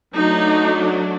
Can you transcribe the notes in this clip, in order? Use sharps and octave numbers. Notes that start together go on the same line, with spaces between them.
F#3 A3 D4 D#4